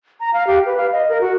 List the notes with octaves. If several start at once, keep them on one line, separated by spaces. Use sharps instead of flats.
A#5
F5
G4
B4
F5
D#5
A#4
F#4